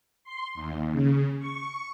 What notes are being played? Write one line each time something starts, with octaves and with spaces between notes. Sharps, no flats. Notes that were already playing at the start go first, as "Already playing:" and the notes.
C6
D#2
C#3
C#6